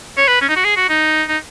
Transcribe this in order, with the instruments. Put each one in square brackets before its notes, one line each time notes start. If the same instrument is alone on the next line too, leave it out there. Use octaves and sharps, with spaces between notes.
[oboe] C#5
B4
C#4
D#4
F#4
G#4
F#4
D#4
D#4